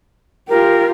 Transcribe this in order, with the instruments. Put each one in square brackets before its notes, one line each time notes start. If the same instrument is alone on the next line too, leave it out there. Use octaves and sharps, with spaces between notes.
[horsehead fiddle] F4 G4 [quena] A#4